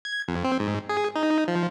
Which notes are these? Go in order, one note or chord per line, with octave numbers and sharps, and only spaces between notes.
G#6
F2
C4
G#2
G#4
D#4
F3